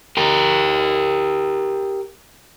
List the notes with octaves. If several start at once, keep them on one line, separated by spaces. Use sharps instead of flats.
G4 A#4